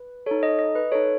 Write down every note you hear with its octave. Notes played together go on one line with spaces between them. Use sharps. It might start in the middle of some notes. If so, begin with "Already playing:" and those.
Already playing: B4
D#4 A4 C#5
D#5
D#5
B4
D#4 A4 C#5